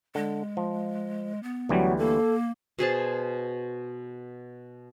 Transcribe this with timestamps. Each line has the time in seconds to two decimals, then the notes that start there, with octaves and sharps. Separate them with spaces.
0.15 D3 G#3
0.57 F3
1.43 B3
1.69 D2 E3 F#3 G3
1.98 A#3 A4
2.79 B2 G#4 C5 A5